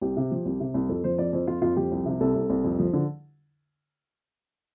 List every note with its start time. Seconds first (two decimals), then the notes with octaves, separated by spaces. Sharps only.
0.02 C2 G4
0.17 C3
0.31 F3
0.45 C2
0.60 C3
0.74 C2
0.89 F2 A4
1.04 F3 C5
1.18 F2 D5
1.33 F2 C5
1.47 F2 F4
1.62 F2 F4
1.77 F3 G4
1.92 C2
2.06 C3
2.21 C2 A4
2.35 C2
2.50 C2
2.64 F2
2.79 F3
2.93 D3